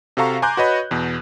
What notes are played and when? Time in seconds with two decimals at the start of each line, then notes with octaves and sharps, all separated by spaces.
0.17 C3 F#4 A4 F5 A#5 C#6
0.42 G#5 A#5 C6 D6 F#6 G6
0.57 F#4 B4 C#5 D#5 B5
0.91 E2 B2